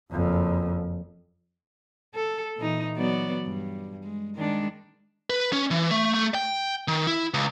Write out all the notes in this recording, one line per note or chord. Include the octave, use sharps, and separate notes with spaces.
F#1 F2
A4
A#2 E3 D#4
F#3 B3 D5
G2
G#3
D#3 G#3 D4
B4
C#4
E3
A3
A3
G5
D#3
E4
C#2